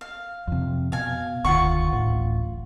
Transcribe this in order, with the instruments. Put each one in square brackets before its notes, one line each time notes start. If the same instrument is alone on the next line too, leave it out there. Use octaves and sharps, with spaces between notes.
[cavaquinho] F5
[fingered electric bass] F2 C3
[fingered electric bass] B2 [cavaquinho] F5 G#5
[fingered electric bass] E1 D2 D#3 [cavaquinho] F4 F#5 C#6
[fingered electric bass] D1 A1 A2